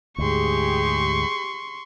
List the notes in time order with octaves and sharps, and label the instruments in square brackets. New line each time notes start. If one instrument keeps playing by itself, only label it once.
[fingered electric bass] D2 G#2 [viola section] G4 G#4 [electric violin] C6 C#6